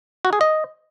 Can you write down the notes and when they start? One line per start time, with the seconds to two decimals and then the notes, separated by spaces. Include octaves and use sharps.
0.25 F#4
0.33 G#4
0.41 D#5